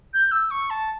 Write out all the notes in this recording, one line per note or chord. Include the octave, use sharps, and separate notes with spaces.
G6
E6
C#6
A5